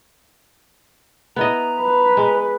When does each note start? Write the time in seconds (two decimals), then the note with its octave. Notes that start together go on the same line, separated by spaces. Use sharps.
1.36 B3 E4 D#5 A#5
1.80 B4
2.17 G#3